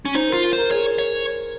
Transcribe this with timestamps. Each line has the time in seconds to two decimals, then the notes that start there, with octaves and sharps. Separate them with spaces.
0.05 C#4
0.15 D#4 C5
0.29 F4 A#4
0.53 A#4 C5
0.71 G#4 C#5
0.98 C#5